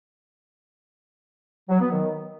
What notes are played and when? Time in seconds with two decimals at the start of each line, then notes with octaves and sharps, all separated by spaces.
1.69 F#3
1.80 B3
1.91 D#3